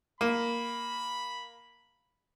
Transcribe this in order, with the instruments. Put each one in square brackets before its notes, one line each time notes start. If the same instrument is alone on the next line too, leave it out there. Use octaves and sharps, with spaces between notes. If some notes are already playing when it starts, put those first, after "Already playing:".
[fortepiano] A#3 [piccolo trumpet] B5